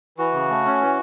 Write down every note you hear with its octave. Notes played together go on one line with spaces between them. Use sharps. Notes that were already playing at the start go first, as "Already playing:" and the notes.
E3 F#4
C#3
A3
C#4
E3